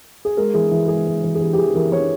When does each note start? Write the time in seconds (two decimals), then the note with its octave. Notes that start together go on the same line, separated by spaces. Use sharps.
0.25 G#4
0.37 G#3 A#4
0.54 E3 G#4
0.71 E3
0.88 G#3 G#4
1.06 G#3
1.24 E3
1.35 G#4
1.41 E3 G4
1.53 G4
1.57 E3 G#4
1.75 E3 A#4
1.92 E3 C#5